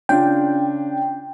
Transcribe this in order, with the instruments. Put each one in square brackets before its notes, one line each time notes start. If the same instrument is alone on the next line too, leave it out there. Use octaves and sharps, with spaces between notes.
[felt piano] C#3 D4 F4 [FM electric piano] G5